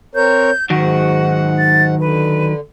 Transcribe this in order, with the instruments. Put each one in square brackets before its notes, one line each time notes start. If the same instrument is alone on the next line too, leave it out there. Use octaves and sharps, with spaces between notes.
[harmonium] C4 A#4 C#5 [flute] G6
[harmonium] G#2 F#5 [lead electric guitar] D#3 F#3 [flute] F#4
[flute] A6
[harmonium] D3 [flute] B4